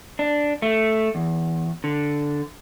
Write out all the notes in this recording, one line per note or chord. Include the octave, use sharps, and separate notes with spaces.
D4
A3
E2
D3